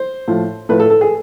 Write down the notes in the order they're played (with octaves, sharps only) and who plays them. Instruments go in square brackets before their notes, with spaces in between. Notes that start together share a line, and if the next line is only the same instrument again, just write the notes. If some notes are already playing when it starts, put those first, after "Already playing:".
Already playing: [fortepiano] C5
A2 F3
A2 F3 B4
A4
A4
G#4